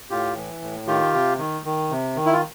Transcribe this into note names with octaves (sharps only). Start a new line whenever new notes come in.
A2 F4 G4
E3
A2
D#3 F4 G4
C3
D#3
D#3
C3
D#3
E4
F4